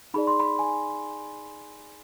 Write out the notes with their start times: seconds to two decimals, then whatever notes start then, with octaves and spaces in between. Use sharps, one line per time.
0.14 D#4 G#4 D5 B5
0.27 C6
0.40 B5
0.59 G#5